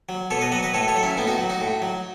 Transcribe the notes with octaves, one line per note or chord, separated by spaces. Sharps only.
F#3
B2 A4 C#5
B4 D#5
F#3 D#5 F#5
B4 D#5
A2 A4 C#5
A4 C#5
F#3
C#4 E4
A2 B3 D#4
D#4 F#4
F#3
D#4 F#4
A2
F#3